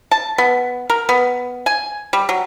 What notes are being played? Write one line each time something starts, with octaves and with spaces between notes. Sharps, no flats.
A5
B3
A#4
B3
G#5
G3
F#3